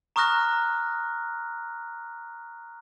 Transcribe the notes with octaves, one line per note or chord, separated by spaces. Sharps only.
A#5 C#6 D#6 F6 F#6 A#6